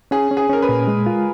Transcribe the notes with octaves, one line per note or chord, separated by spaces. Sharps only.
C#4 G#4
C#4
G#4
C#4 A#4
B4
A#2
G#3
F4